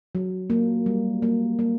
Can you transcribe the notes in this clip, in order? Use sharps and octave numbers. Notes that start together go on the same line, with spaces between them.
F#3
A#3
G3
A#3
A#3